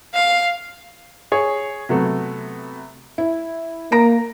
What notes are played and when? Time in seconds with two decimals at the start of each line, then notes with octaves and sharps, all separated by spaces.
0.14 F5
1.32 G#4 C#5
1.89 C3 F#3 A3 B3
3.18 E4
3.92 A#3 A#5 A#6 D7